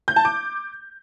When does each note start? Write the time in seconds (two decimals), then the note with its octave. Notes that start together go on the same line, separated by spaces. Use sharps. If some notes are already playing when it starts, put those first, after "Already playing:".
0.08 G6
0.16 A5
0.25 D6